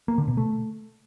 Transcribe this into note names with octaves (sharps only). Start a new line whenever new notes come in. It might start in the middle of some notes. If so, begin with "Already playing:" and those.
A#3
D3
B2
A3